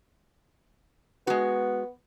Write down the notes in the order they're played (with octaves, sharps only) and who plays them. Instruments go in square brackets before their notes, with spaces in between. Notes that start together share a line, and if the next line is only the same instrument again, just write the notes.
[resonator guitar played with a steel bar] G#3 F#4 [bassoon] B3